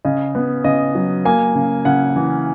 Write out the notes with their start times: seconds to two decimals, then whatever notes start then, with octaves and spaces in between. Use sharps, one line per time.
0.05 C#3 D#5
0.35 B3
0.64 C#3 D#5
0.95 F#3
1.25 A#3 G#5
1.55 C#3
1.85 C#3 F#5
2.16 E3